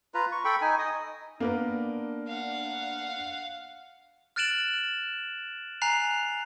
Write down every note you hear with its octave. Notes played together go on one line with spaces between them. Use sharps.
F4 B4 A#5
C#6
A4 G5 B5 C#6
D#4 G#5
D#5 D#6
A#3 B3 D4 A#4
F5 F#5
F6 F#6 A6 D7 E7 F#7
G#5 A#5 F#6 C7 F7